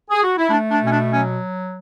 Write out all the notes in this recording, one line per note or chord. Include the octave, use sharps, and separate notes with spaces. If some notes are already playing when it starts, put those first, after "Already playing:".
G#4
F#4
E4
A3 D4
D4
B2 C#4
D4
F#3 C#4